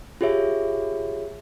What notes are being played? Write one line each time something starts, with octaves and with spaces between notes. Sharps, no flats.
F4 G4 G#4 C#5 E5